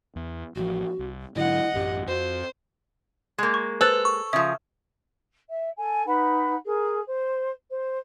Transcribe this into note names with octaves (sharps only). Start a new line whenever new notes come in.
E2
A1 F3 F#4
C2
G#2 D3 F#3 E4 D#5 F#5
A1 F#2 G4
F2 F#4 C5
G#3 A#3
C#6
A4 B4 C5 F#6 A6
C#6
C#3 F3 E5 D#6
E5
A4 G#5
D#4 B4 F#5 B5
G#4 A#4
C5
C5